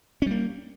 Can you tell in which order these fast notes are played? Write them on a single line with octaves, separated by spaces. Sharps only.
C#4 G3 A#3